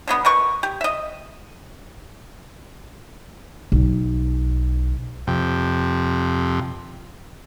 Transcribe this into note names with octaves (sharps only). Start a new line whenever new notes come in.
D3 F#3 B3
B2 A#4 B4 C#6
G4
D#5 E5
B1
F2 C3